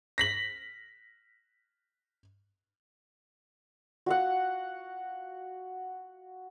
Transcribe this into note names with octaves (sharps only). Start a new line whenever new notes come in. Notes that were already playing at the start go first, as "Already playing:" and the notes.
A#6 B6 F#7
F#4 F5 F#5